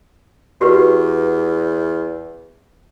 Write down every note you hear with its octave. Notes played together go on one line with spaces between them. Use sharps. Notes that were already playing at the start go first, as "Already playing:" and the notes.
E2 F#4 G4 B4